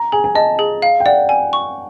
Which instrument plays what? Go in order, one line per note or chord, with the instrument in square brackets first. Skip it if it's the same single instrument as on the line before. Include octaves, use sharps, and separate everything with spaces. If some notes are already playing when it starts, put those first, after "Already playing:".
Already playing: [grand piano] A#5
[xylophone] G#4 [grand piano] G#5
[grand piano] G#5
[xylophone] D#5 [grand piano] A5
[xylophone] G#4
F5
[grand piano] G5
[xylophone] D5 [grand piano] F#5
[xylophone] G#5
C#6